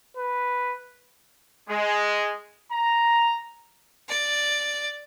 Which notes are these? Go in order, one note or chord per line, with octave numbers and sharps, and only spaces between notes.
B4
G#3
A#5
D5